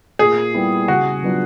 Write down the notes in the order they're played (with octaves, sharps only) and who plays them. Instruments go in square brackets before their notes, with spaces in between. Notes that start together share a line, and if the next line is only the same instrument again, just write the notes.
[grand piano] A#2 [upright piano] G#4
[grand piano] G3 B3 E4 G4
[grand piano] C#3 [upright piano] F#4
[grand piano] F#3 B3 D4 F4